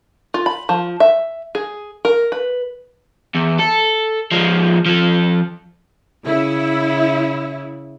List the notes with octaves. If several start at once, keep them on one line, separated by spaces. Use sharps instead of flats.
F4
B5
F3
E5
G#4
A#4
B4
E2
A4
F3 G#3
F3 A4
C#3 E4